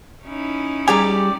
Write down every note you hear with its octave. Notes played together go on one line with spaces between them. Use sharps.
C#4 D#4 E4
G3 G4 G#4 D5 G#5 A#5